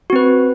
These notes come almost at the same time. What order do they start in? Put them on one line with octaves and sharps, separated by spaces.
F#4 C4 B4